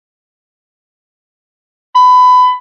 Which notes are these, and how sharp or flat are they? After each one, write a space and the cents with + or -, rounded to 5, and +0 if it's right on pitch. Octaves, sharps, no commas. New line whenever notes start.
B5 +20